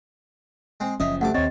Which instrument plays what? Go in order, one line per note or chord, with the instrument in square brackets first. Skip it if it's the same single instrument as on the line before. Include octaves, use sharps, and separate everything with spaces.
[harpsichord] G#3 C4
[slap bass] F#1 F3 C#4 [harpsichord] D#5 E5
[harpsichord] D2 G2 D6 [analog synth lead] A3 [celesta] F#5
[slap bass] D#2 C4 [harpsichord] C3 [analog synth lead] C#5 [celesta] D#5 A6